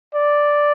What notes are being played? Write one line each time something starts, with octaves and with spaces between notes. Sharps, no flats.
D5